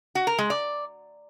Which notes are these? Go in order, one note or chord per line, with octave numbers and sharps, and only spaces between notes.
F#4
A#4
G#3
D5